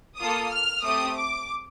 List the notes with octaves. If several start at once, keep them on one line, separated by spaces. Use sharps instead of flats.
A#3 F4 A4 D#6
F6
A3 C4 G4 D#6
D6